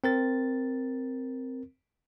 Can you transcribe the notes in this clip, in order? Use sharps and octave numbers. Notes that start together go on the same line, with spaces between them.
C4 A#4 A6